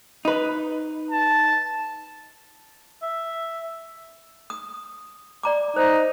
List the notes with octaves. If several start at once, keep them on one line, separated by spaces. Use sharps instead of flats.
D#4 B4
A5
E5
D#6
D5 A#5 D6
D#4 C5